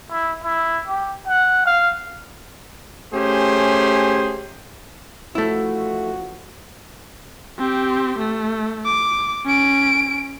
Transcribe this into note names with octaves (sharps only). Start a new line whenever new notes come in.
E4
E4
G4
F#5
F5
A3 C#4 G4 G#4 C5
A1 F3 A3 E4 F#4
C4 G4
A3
D6
C#4 D7